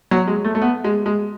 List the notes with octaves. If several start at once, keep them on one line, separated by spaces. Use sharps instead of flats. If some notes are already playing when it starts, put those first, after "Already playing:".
F#3
G#3
A3
A3
B3
G#3
G#3